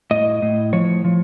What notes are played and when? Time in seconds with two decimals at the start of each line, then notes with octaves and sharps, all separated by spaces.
0.11 A2 D#5
0.42 A2
0.73 F3 C#5
1.04 F3